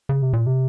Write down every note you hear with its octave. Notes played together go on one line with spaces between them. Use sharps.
C#3
C3
A#2
C3